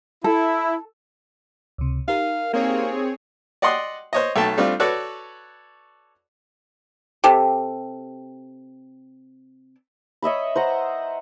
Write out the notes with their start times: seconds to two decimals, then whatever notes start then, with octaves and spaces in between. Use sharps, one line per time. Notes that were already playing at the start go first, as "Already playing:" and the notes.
0.24 E4 A4
1.78 C#2 C3
2.08 D#4 G4 A#4 F5
2.54 A#3 C4 G#4 C#5
3.62 D5 D#5 F#5 G5 C6 D#6
4.13 C5 C#5 D#5
4.36 B1 A3 G5 A5
4.58 G3 A3 C4 D4 F4
4.80 F#4 A4 B4 C#5 D5
7.24 C3 G4 A4
10.22 C#5 D#5 E5 B5
10.56 C5 F#5 A#5